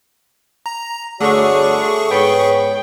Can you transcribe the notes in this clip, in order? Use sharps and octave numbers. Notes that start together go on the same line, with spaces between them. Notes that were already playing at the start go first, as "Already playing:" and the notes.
A#5
G1 D3 A3 F#4 G#4 C#5 C#6
A3
G#2 B3 C#5 G5